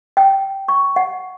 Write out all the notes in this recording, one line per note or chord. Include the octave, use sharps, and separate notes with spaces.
G5
C#6
F#5